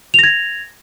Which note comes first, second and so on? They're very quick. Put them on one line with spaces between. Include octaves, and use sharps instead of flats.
F7 A#6 G#6